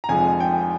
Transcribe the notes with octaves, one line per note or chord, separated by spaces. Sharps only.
A#5
F1 F2 D3 F3 G#3 G#5
G5